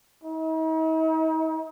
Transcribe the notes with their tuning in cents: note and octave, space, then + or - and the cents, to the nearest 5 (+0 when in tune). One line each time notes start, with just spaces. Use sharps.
D#4 +45